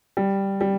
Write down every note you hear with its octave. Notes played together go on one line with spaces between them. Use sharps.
G3
G3